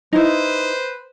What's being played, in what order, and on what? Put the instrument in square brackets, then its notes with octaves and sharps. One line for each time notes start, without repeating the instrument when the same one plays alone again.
[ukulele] D#4 E4 [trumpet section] B4 C5